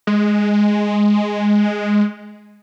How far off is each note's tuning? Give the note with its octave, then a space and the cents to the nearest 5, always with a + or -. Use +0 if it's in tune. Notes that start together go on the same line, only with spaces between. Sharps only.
G#3 +0